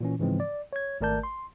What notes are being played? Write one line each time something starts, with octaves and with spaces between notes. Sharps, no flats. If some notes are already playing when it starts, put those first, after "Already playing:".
A#2 E3 C#4
G#2 C#3 E3 F3 G#3 C4
D5
C#5 G#6
G#1 A3 A#4 D5 A5 G6
C6